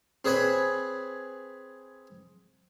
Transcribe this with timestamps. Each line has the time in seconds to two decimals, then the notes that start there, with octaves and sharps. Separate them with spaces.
0.25 C4 G#4 B4 C#5 G#5 B5